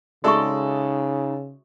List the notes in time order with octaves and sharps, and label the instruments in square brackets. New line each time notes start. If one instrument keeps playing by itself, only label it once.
[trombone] C#3 [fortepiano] G#3 A4 D5 [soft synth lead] D#4 [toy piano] F#4 E5 C#6